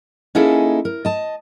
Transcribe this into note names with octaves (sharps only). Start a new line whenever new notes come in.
A#3 C#4 D#4 E4 G#4 A4
A#4
D#5 A5